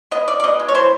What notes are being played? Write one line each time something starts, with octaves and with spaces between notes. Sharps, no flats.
B3 D#5
B2 D5
D5
B2 D#5
G#3
C#5
E3 C5